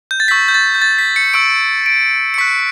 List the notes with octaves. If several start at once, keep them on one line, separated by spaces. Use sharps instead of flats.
G6
A6
C#6 E6 G6 B6
G6
A6
G6
A6
B6
C#7
C#6 E6 G6 D7
D7
C#7
C#6 F#6 B6